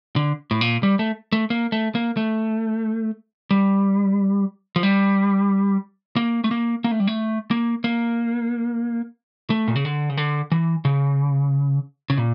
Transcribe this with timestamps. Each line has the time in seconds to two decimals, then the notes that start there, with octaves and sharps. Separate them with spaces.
0.16 D3
0.51 A2
0.61 A#2
0.83 G3
0.99 A3
1.32 A3
1.50 A#3
1.72 A3
1.95 A#3
2.17 A3
3.51 G3
4.76 F3
4.83 G3
6.16 A#3
6.44 A3
6.51 A#3
6.84 A#3
6.91 A3
7.00 G3
7.07 A3
7.51 A#3
7.84 A#3
9.50 A3
9.68 A#2
9.76 C#3
9.85 D3
10.10 C#3
10.17 D3
10.52 E3
10.85 C#3
12.10 C#3
12.18 A#2